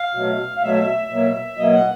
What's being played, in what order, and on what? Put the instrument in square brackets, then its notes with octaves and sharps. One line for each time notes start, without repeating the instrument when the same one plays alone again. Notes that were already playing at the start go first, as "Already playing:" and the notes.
Already playing: [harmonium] F5
B2 F#3 A3
F5
B2 F#3 A3 E5
B2 F#3 A#3
B2 F#3 A#3 D#5
F#5